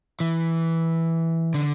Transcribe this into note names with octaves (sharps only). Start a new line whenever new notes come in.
E3
D3